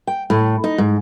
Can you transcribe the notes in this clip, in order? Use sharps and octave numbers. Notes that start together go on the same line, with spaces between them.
G5
A2
D#4
G#2